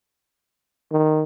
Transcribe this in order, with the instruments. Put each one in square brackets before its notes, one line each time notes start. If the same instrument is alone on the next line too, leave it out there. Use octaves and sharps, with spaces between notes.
[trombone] D#3